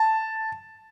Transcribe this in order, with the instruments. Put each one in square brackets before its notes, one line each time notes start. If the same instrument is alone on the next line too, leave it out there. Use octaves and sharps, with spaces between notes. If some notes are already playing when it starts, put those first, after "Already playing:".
Already playing: [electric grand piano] A5